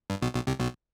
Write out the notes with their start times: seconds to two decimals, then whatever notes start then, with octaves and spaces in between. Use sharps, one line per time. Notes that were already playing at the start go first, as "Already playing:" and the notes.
0.10 G2
0.22 B1 B2
0.34 B1 B2
0.47 C2 C3
0.60 B1 B2